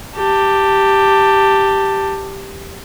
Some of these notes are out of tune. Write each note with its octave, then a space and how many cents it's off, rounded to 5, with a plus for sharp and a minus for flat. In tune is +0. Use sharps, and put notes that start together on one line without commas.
G4 +0 A5 +15